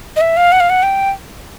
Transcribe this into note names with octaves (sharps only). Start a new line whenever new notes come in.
D#5
E5
F5
F#5
F5
F#5
G5